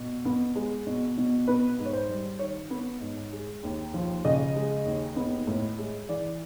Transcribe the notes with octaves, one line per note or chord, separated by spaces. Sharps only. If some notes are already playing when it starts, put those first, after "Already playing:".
Already playing: B2
B3
G#3
B2
B2
B3 B4
G#2
C#5
C5
G3
D#3 C#5
B3
G#2
G#3
D#2
F3
C#3 D#5
G#3
D#2
B3
A2
G#3
E3 D5